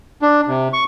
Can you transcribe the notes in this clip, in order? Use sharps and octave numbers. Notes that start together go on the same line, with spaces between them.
D4
C3
C#6